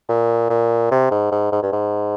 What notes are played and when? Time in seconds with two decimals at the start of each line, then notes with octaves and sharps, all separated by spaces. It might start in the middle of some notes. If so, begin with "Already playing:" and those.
0.09 A#2
0.49 A#2
0.91 C3
1.11 G#2
1.31 G#2
1.52 G#2
1.62 G2
1.72 G#2